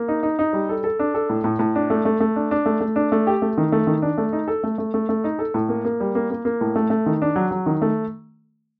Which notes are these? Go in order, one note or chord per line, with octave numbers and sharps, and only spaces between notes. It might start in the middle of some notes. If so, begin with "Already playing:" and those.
Already playing: A#3
D#4
D#4
D#4
G3
A4
A4
D4
A4
A2
A2
A2
D4
A3
A3
A3
D4
D4
A3
A3
D4
A3
G4
A3
D#3
A3
D#3
D4
A3
D#4
A4
A3
A3
A3
A3
D#4
A4
A2
A#3
A#3
G3
A#3
A#3
A#3
A2
A3
A3
D#3
D4
F#3
F#3
D#3
A3